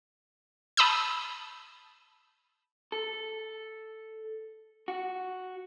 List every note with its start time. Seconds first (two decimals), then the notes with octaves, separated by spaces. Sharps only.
0.77 A5 B5 D#6 E6 G6
2.92 A4
4.88 F#4